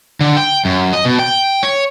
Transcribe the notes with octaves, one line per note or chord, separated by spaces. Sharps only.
D3
G5
F#2
D#5
B2
G5
C#5